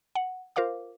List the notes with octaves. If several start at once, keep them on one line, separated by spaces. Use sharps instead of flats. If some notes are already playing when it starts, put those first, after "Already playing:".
F#5
F4 A#4 C5 F5 D6